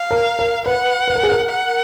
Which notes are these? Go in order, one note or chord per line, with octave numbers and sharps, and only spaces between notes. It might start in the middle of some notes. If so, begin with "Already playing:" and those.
Already playing: F5
A#4
A#4
B4 F#5
B4
A#4
G#4
A#4
F#5